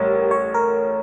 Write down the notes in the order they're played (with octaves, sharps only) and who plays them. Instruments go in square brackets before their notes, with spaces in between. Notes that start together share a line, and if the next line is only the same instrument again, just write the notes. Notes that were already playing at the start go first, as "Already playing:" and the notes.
Already playing: [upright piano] A1 A2 G3 [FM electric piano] G4 A#4 C#5
[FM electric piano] C#5
A#4